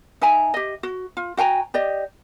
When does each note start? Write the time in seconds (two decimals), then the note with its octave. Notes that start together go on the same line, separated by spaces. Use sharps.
0.21 D#4 E5 G#5 A#5
0.54 G4 D#5
0.83 F#4
1.17 F4
1.37 F#4 G5 G#5 A#5
1.74 G4 D5 D#5